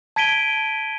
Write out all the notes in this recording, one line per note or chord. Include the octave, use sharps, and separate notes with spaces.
A5 G#6 B6 D7 D#7 G7